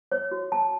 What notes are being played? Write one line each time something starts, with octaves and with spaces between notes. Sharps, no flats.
C#5
F#4
A5